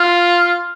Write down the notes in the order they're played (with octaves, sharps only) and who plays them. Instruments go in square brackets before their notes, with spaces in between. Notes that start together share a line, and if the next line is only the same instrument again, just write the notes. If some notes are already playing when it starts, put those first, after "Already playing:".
Already playing: [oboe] F4